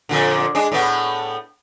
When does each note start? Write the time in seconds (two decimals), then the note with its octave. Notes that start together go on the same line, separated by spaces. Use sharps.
0.09 F2 A#2 D3
0.55 G#3 D4
0.72 A2 B3